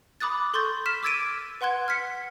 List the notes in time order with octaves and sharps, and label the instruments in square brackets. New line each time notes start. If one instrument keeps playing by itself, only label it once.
[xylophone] B5 D6 D#6 F#6 A6
A4 C6 C#6 G6 A6
F6 B6 E7
D6 E6 G#6 A6 D7 D#7
B4 F#5 C6 F#6 G#6
F6 G#6 B6 C#7